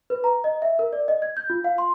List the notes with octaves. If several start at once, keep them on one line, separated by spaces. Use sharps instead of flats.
B4
A#5
D#5
E5
A#4
D5
D#5
G#6
G6
F4
F5
C6